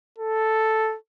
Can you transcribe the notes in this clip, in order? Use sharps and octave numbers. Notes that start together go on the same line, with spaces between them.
A4